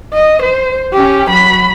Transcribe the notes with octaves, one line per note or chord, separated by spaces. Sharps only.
D#5
C5
C#4 G4
F#3 B5